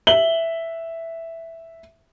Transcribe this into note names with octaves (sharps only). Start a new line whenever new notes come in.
E5 F#7 G7